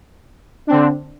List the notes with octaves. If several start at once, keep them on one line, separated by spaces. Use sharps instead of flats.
D3 C4 D4